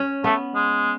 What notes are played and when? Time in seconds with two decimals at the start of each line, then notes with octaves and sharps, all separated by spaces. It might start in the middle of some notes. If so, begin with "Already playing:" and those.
Already playing: C#4
0.24 A3 B3
0.55 G#3